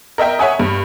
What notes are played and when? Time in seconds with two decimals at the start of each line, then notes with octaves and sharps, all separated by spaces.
0.18 A#4 D#5 E5 G5
0.39 C#5 E5 F#5 G#5 D#6
0.60 G2